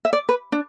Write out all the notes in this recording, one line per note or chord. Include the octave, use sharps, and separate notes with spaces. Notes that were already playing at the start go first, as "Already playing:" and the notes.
E5
D5
B4
D4